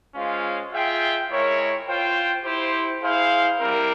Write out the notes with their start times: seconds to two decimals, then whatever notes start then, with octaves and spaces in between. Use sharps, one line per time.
0.15 G#3 C#4 F4 C5 F5
0.72 F4 G#4 E5 G5
1.30 G#3 E4 A#4 C#5
1.87 F4 C5 G5
2.45 E4 G4 C5
3.02 E4 G#4 C5 F5
3.60 G3 C4 E4 A#4